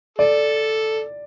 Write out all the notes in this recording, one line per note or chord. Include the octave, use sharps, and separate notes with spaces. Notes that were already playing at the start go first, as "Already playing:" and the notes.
A4 D5